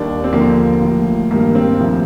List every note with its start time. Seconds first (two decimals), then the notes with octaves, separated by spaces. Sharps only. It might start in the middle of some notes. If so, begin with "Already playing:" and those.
Already playing: D#2 D#3 G3 D4
0.24 C4
0.33 D#2 D3 F3 A#3
0.82 A2 F3
1.31 G2 D#3 G3 A#3
1.55 C4
1.80 D2 C3 F3